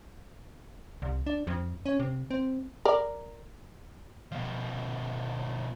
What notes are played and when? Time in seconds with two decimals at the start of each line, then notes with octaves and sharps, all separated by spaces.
1.02 C2
1.26 D4
1.47 F2
1.86 C#4
2.00 C3
2.31 C4
2.85 A#4 D5
4.32 B2 F3